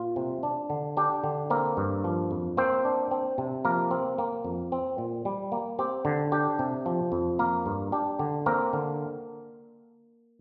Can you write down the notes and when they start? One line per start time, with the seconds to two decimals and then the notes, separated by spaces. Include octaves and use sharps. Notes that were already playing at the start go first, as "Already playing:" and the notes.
Already playing: A#2 F4
0.16 C3
0.43 D4
0.70 D3
0.97 D4 G4
1.24 D3
1.50 A#3 C4 A#4
1.77 G2
2.04 F3
2.31 F2
2.57 A#3 C4 C5
2.85 D4
3.11 C4
3.38 C3
3.65 F3 A#3 A#4
3.91 C4
4.18 A#3
4.45 F2
4.72 C4
4.98 A#2
5.25 G3
5.52 A#3
5.79 C4 G4
6.05 D3
6.32 D4 G4
6.59 C3
6.86 F3
7.12 F2
7.39 A#3 A#4
7.66 G2
7.92 D4 G4
8.19 D3
8.46 A#3 C4 A#4
8.73 D3